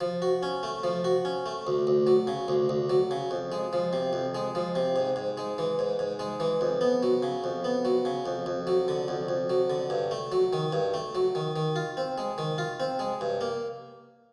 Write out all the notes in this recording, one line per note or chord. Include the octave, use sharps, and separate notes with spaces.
F3
F#4
C#4
A3
F3
F#4
C#4
A3
D2
D2
F#3
C#3
D2
D2
F#3
C#3
F2
G#3
F3
C3
F2
G#3
F3
C3
G#2
G#2
G#3
E3
G#2
G#2
G#3
E3
F2
B3
F#3
C#3
F2
B3
F#3
C#3
F2
F2
F#3
D3
F2
F2
F#3
D3
G2
A3
F#3
D#3
G2
A3
F#3
D#3
D#3
F4
C4
G#3
D#3
F4
C4
G#3
G2
A#3